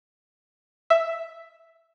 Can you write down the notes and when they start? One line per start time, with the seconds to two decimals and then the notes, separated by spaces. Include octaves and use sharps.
0.90 E5